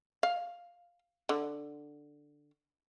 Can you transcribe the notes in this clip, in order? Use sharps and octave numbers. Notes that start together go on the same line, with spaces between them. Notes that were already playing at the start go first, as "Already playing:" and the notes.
F5
D3